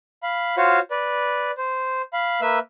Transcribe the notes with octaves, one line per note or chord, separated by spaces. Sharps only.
F5 B5
F4 F#4 C5 C#5 F5
B4 D5
C5
F5 B5
A#3 B4 E5 E6